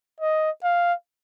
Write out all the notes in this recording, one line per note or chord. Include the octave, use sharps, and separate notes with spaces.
D#5
F5